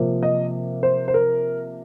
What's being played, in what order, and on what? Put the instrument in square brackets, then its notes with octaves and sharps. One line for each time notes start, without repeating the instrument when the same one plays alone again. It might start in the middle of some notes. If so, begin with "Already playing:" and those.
Already playing: [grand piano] C3 F3 A#3
D#5
C5
C5
A#4